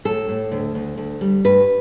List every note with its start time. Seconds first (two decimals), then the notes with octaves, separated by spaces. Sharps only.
0.05 A2 A4
0.29 A2
0.52 D2
0.75 D2
0.97 D2
1.21 G3
1.44 G2 B4